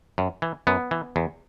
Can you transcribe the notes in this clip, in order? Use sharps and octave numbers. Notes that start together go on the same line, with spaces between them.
F#2
E3
F#2 B3
E3
E2